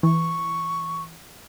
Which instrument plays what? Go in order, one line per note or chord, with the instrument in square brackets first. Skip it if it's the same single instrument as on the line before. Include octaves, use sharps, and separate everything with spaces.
[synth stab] E3 [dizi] C#6